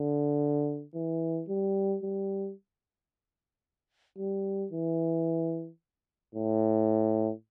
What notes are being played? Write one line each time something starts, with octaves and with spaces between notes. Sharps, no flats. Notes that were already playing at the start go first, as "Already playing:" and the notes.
Already playing: D3
E3
G3
G3
G3
E3
A2